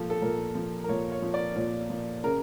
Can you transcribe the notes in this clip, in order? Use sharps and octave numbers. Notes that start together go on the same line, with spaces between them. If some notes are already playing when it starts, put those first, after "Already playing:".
Already playing: A#2 F3 A4
A4
A#2 A#4
F3
A#4
A#2 C#5
C#5
F3
D5
A#2
F3
C#3 A#4